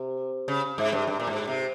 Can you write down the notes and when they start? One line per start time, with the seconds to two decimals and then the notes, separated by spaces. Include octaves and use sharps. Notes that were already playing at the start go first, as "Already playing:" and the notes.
Already playing: C3
0.48 C#3
0.78 G#2
0.92 G2
1.07 G2
1.20 A#2
1.27 G#2
1.47 C3